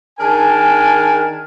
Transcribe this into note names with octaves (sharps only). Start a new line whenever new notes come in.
D#3 D4 G#4 A#4 G#5 A5